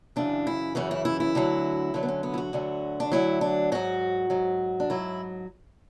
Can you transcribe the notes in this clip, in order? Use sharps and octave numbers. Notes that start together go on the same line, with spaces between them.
F#2 C#3 E3 D4
E4
F#2 C#3 E3 F#4
E4
E4
E4
D2 D3 F#3
D2 D3 F#3
B3
C#4
B3
E4
F#4
D2 D3 F#3
D4
D2 D3 F#3 E4
D4
G#2 F#3 F#4
G#2 F#3
D4
G#2 F#3 E4